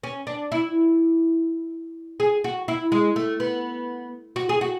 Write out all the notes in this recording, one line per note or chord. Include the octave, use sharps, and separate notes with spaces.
C#4
D4
E4
G#4
F#4
E4
G#3
A3
B3
F#4
G#4
F#4